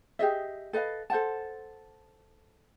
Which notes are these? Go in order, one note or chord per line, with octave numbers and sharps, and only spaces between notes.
G4 G#4 D#5 E5
A4 B4 D#5 F5
A4 C5 F#5 A5